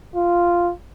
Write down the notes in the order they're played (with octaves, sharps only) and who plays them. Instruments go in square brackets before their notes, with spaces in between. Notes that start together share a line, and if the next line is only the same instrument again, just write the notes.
[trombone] F4